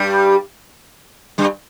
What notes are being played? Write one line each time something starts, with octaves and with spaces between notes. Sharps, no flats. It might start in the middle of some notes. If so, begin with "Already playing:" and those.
Already playing: G2 G3
G2 G3